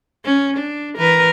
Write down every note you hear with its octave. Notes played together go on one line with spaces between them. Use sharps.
C#4
D4
E3 A#4 B4